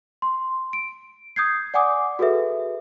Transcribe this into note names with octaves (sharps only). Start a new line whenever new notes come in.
C6
D7
D#6 G6 G#6 C7
D5 F#5 G#5 D6 D#6
F#4 G#4 A4 B4 E5